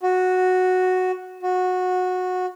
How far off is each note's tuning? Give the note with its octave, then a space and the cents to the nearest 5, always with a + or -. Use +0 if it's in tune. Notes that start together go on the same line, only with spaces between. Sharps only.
F#4 -5
F#4 -15